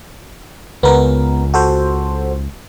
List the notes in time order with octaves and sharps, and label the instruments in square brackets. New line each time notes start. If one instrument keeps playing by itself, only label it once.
[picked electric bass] C#2 [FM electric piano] B3 A#4
[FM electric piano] F#4 A4 C5